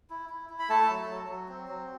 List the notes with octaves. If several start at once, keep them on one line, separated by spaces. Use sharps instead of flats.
E4
E4
E4
B5
A3 A4 A5
F#3
F#3
F#3
C4
F#3